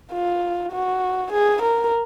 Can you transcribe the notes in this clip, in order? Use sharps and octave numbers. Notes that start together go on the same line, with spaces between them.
F4
F#4
G#4
A#4